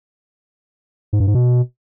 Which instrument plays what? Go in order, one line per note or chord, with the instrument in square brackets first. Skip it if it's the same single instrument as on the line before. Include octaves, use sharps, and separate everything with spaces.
[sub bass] G#2
G2
G#2
B2